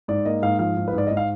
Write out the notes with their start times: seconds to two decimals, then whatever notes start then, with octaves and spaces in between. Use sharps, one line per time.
0.08 G#2 D5
0.25 A#3 D#5
0.42 G#2 F5
0.59 F3 F5
0.77 G#2
0.88 B4
0.93 G#2 D5
1.07 G#2 D#5
1.17 F5